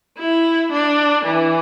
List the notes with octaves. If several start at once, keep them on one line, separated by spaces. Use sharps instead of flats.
E4
D4
E3